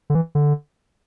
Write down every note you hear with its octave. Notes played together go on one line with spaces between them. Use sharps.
D3
E3
D3